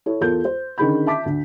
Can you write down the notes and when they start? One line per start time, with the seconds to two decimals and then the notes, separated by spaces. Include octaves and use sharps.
0.06 E4 A4 C#5
0.21 E2 F4 A4 A#4 G6
0.45 C5
0.78 D3 D#3 C#4 G#4 B5 G6
1.06 E5 A5 D6 B6
1.26 D2